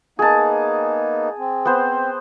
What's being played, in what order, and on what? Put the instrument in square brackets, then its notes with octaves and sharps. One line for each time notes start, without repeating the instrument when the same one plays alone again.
[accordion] A#3 B3 D#4 [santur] G#4 A5
[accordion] C4
[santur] B3 C5